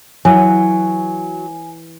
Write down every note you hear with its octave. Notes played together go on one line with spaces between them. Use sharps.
E3 F#3 G#5